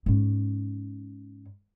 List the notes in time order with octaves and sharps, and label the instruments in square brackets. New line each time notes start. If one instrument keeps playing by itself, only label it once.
[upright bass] G#2 C#4